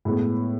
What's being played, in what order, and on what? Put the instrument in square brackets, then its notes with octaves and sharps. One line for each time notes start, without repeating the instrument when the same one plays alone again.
[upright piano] A2 G#3 B3